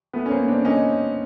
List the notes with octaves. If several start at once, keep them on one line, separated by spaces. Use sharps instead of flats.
A3 B3
C#4
A#3 C4
C4 D4
C#4 D#4